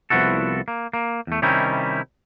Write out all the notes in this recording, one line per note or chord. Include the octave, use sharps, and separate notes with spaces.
C2 F3 B3 E4 F#4 A4
A#3
A#3
E2 A3
C3 D#3 G3 C#4 D#4 E4